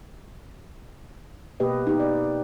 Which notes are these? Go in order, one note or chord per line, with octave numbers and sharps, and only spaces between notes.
B2 A#3 G4 B4 D#5
D#4 G4
D5